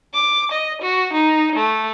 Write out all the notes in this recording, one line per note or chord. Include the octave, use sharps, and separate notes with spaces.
D6
D#5
F#4
D#4
A3